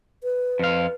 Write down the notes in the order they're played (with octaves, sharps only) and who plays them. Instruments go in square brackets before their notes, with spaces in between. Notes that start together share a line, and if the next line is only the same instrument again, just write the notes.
[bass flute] B4
[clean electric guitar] F2 F5